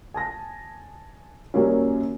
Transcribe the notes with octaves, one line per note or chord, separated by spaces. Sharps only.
G#5 A5 A#6
F#2 D#3 F#3 G3 A#3 C#4